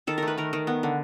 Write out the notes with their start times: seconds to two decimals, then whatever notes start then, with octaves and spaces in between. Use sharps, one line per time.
0.07 D#3 A4
0.18 A3 A#4
0.28 B4
0.38 D#3 A#4
0.53 D#3
0.67 B3
0.83 D3